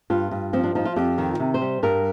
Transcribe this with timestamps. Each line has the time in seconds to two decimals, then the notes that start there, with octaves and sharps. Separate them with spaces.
0.10 G2 F4
0.31 G2
0.53 F3 C4
0.64 D4
0.75 F3 D#4
0.85 F4
0.96 F2 G4
1.18 D#3
1.40 C3
1.54 C5
1.61 G3
1.83 G2 A#4